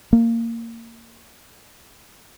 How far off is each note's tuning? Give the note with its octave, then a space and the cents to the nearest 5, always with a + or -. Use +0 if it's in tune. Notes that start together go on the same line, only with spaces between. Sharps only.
A#3 -20